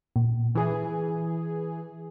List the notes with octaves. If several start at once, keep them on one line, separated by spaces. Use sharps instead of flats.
A#2
E3 G#4